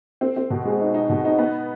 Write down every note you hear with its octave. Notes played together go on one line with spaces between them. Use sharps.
C4
C4
B2
G#3
D#4
D#4
B2
D#4
B3